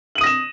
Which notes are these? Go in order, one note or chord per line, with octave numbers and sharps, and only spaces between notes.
D#6 A#6 D#7 E7 F#7